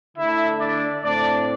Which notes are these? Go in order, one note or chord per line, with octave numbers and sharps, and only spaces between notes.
D3 A3 D4 E4 E5
D4 D5
A2 A3 C4 D4 D5